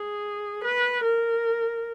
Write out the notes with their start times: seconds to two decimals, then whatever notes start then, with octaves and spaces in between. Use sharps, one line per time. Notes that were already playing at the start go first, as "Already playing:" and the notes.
Already playing: G#4
0.64 B4
1.03 A#4